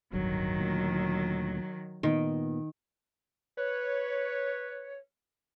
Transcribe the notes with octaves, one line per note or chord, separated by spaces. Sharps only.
D1 G1 G2 D#3 F#3
D2 A#2
A#2 D#3 B3
B4 C#5